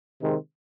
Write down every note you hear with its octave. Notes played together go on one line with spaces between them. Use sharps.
C3 D#3 G#3 C4